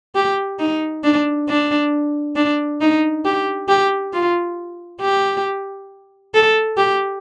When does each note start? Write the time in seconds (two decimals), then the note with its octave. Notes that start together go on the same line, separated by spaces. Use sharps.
0.15 G4
0.59 D#4
1.03 D4
1.48 D4
2.36 D4
2.81 D#4
3.25 G4
3.68 G4
4.13 F4
5.01 G4
6.34 A4
6.77 G4